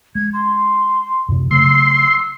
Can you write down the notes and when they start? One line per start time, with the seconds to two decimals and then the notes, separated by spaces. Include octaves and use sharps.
0.15 G#3 G#6
0.34 C6
1.29 F#2 C3
1.51 C#3 F#3 A3 C6 E6
1.95 E6